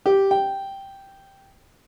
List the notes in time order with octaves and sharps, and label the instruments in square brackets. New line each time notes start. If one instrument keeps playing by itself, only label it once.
[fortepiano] G4
G5